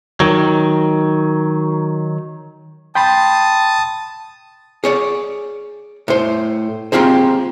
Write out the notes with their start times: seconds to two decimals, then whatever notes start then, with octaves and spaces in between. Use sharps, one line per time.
0.20 D#3 F#3
2.95 G5 A5 B5 C6 D#6
4.84 G#4 C#5 D5
6.08 A2 C5
6.92 A#3 C4 F4 G4 G#4 C5